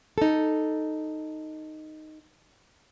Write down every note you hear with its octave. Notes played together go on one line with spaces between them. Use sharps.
D#4 A4